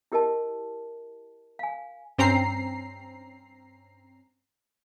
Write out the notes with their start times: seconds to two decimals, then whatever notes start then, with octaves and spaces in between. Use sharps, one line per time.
0.12 E4 G4 A#4 D#5 A5
1.59 F5 G#5
2.18 G2 C4 C#4 A#5 C7